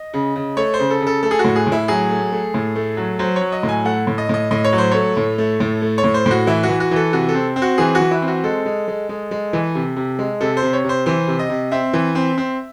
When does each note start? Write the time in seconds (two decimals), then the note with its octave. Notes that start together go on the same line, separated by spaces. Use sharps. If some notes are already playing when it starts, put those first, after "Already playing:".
Already playing: D#5
0.14 C#3
0.36 C#3
0.57 A3 C#5
0.74 C5
0.79 C#3
0.90 A4
1.01 C#3
1.07 A4
1.23 A3 A4
1.31 G#4
1.39 F#4
1.44 A2
1.56 G#4
1.67 A2
1.72 E4
1.88 F#3 G#4
2.10 A3
2.32 A3
2.54 A2
2.76 A3
2.97 F#3
3.19 F#3 C5
3.36 C#5
3.41 F#3
3.52 D#5
3.63 A2
3.69 G#5
3.85 A3 F#5
4.07 A2
4.18 D#5
4.29 A2 D#5
4.51 A2 D#5
4.64 C#5
4.72 F#3
4.78 C5
4.91 A3 C#5
5.17 A2
5.38 A3
5.60 A2
5.82 A3
5.98 C#5
6.04 A2
6.14 C5
6.26 A2
6.31 F#4
6.47 E3 E4
6.63 F#4
6.69 E3
6.80 F#4
6.91 E3 A4
7.12 C3 F#4
7.29 A4
7.35 C4
7.56 C4
7.62 F#4
7.78 E3 G#4
7.95 E3 F#4
8.11 E4
8.22 C4
8.28 F#4
8.44 G#3 A4
8.66 G#3
8.88 G#3
9.09 G#3
9.31 G#3
9.53 E3
9.75 C3
9.96 C3
10.19 G#3
10.41 C3 A4
10.57 C5
10.62 C3
10.73 C#5
10.84 C3 C5
11.06 E3 C5
11.28 C3
11.39 D#5
11.50 C3
11.71 C4 E5
11.93 E3
12.15 C4
12.38 C4